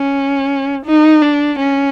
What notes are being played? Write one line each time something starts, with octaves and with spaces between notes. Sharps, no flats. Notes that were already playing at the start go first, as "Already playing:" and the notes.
Already playing: C#4
D#4
D4
C#4